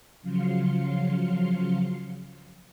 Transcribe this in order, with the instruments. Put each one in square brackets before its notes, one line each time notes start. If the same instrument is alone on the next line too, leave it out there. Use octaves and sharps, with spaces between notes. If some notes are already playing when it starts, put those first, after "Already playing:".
[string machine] C#3 F3 F#3 F5 C6 C#7